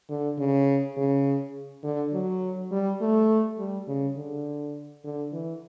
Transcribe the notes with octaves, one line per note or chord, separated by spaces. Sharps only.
D3
C#3
C#3
D3
F#3
G3
A3
G3
C#3
D3
D3
E3